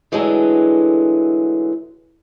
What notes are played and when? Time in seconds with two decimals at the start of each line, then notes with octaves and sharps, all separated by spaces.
0.12 D3 E3 F#3 G#3 A3